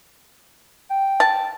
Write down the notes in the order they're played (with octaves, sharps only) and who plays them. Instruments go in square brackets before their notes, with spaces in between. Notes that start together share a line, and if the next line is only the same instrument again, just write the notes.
[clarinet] G5
[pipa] A5